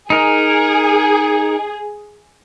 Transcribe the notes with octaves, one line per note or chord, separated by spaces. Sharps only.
D#4 G#4 A#4